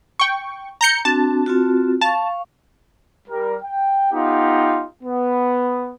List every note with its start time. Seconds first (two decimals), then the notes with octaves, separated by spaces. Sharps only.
0.20 G5 C#6
0.81 A#5 G6 C#7
1.05 C4 D4 F#4 A5
1.46 C4 F4 F#4
2.01 F5 A5 C#6
3.28 G3 A#4
3.62 G5
4.12 B3 D#4 F4 G4
5.03 B3